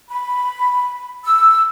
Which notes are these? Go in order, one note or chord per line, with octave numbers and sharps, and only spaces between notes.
B5
E6